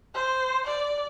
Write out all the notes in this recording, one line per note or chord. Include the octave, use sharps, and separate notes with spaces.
C5
D5